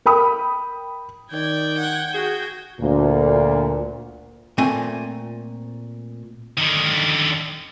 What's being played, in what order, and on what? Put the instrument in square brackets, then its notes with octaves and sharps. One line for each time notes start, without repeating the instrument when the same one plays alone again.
[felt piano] A#4 G5 B5 D#6
[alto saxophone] D#3 [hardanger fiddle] D5 [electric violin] G5 G#6
[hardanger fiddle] F#5
[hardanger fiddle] F#4 [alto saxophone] G#4
[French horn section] D2 A#2
[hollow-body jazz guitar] A#2 A3 C4 G#5
[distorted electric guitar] D3 D#3